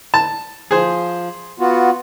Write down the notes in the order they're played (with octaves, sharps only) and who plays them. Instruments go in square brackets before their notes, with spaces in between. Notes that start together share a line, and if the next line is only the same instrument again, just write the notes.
[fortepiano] A5
[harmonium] F3 [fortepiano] G#4 C5
[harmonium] B3 F4 F#4